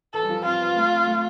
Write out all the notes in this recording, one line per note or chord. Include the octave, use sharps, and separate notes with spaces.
E3 A4
G3
F3
C4 F4
B3
A3
C4
A3